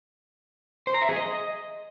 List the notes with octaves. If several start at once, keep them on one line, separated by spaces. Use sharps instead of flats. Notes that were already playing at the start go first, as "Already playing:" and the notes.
C5
A#5
E5
G#4
D#5